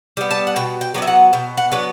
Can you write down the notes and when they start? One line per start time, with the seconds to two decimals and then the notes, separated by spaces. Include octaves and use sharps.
0.17 G3 B3
0.31 A5
0.47 F#5
0.56 B2 G5
0.81 G5
0.94 F#3 B3 D4
1.02 E5
1.07 F#5
1.33 B2 G5
1.57 F#5
1.72 F#3 B3 D4